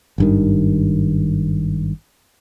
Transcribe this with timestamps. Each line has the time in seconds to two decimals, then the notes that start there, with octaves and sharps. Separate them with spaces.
0.18 G#1 G2 D#3